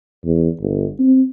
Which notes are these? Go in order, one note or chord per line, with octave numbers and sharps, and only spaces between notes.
E2
G1
C4